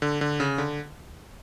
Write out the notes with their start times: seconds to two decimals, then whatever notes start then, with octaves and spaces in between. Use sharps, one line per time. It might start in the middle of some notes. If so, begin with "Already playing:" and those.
0.02 D3
0.21 D3
0.40 C#3
0.58 D3